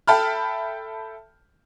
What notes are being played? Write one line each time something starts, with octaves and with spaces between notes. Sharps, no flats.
A4 E5 G5 A5 B5 F6